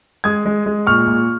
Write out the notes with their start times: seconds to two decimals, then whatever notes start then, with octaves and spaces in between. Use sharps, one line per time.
0.24 G#3 D#6 G#6
0.46 G#3
0.66 G#3
0.87 A#2 C#6 F6
1.08 A#2